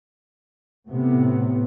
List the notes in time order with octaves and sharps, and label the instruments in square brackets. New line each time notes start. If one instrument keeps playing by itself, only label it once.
[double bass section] A2 C3 B3